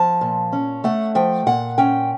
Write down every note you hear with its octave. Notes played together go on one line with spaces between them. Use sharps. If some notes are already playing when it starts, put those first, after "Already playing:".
Already playing: F3 A5
A#2
C#4
A3 F#5
F3 G5
A#2 F#5
C#4 G5